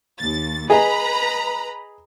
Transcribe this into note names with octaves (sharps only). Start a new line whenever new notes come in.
D#2 A6
G#4 B4 D#5 A#5 B5